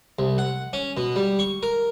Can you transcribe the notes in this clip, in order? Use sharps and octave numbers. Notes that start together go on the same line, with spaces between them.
C2
F#5
C#4
B2
G3
C#6
A#4